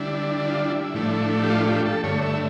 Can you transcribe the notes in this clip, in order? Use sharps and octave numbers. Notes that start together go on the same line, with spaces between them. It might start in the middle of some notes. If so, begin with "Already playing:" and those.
Already playing: D3 G3 D4 E4
E4
F4
E4
A2 F3 A3 D4
G4
F4
G4
A4
G2 D3 A3 C#5
E5